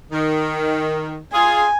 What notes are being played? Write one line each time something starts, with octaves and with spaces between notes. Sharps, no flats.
D#3
F4 G#4 G#5